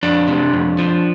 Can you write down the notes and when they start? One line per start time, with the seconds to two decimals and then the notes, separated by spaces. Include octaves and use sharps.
0.03 F2 D4
0.28 C3
0.53 F2
0.78 F3